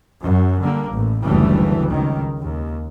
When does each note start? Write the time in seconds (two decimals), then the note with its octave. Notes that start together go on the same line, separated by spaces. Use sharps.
0.20 F#2
0.63 D3 G3 A#3
0.92 A1 A2
1.22 F#1 D2 C#3 E3 G3 A3
1.89 C#2 D#3
2.39 D#2